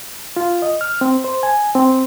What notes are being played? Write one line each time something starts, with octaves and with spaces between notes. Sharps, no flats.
F4
D#5
F6
C4
C5
G#5
C4